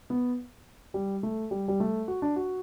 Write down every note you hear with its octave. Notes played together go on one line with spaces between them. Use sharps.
B3
G3
A3
G3
G3
A3
F#4
D4
F#4